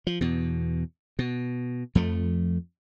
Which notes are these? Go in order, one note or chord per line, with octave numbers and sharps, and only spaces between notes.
F3
E2 B2
B2
F2 F3 A3